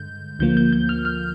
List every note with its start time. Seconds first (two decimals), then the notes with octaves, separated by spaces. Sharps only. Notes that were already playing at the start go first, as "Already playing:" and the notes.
Already playing: G2 D3 G#3 G6
0.39 D2 D3 F3 A#3 G6
0.57 G6
0.73 G6
0.89 F6
1.05 F6